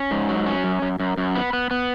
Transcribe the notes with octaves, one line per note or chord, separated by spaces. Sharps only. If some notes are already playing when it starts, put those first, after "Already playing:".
Already playing: C#4
G#2
F#3
C#4
F#2
F#2
F#2
F#2
B3
B3
B3